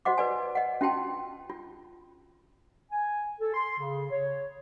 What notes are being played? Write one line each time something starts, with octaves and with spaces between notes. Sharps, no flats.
F#4 C5 D#5 F#5 D6
B4 D5 G#5
D#5 F#5
C#4 F4 F#4 G5 A5
F4
G#5
A4
C6
C#3
C#5